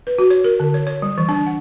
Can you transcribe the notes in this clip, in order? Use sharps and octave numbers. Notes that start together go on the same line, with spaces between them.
B4
F#4
C#5
A#4
D3
C#5
C#5
G3
E3
D4
F#5